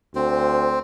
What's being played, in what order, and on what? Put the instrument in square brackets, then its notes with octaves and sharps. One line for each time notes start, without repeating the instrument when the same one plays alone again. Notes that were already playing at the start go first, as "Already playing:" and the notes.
[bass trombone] D2 [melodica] C4 C5